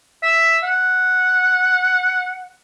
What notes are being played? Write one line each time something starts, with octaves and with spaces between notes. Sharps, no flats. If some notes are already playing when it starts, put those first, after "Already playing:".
E5
F#5